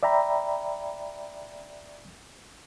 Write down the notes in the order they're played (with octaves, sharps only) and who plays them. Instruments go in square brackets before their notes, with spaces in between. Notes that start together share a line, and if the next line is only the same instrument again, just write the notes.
[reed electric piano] D5 E5 G5 A#5 B5